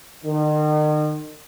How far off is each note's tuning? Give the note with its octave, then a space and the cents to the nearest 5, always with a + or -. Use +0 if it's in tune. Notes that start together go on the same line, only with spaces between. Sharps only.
D#3 -40